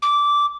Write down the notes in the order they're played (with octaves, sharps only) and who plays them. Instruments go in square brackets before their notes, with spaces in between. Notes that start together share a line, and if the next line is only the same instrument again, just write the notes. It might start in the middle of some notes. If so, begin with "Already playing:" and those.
[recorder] D6